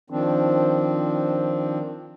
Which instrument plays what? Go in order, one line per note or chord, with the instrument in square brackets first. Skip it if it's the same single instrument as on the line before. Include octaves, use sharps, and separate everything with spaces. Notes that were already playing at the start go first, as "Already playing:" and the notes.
[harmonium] D#3 F3 C4 D4